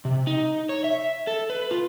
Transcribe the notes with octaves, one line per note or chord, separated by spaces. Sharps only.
C3
D#4
C#5
E5
A4
B4
F4